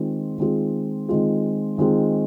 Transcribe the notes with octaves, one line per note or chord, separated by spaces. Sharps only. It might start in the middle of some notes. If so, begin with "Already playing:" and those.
Already playing: D#3 G#3 C4 F4 G#4
D#3 G#3 C4 F4 G#4
D#3 G#3 C4 F4 G#4
D#3 G#3 C4 F4 G#4